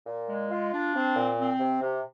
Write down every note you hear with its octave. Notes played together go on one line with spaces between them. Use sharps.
A#2
G#3
F4
D4
C4
A#2
C4
C3
C3